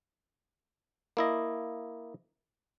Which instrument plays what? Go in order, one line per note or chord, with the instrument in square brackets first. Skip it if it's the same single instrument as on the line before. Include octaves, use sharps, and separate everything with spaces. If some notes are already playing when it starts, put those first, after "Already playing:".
[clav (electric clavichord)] A#3 E4 D#5